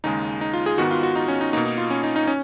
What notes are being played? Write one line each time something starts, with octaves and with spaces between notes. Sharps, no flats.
D#2 C#3 G#3 D#4
D#4
F4
G#4
G#2 D#3 G#3 B3 F#4
F4
F#4
D#4
C#4
D#4
B2 A#3 D#4
D#4
F4
C#4
D#4
D#4
C#4